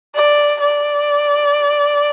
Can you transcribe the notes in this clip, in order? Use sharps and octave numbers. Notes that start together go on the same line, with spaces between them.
D5
D5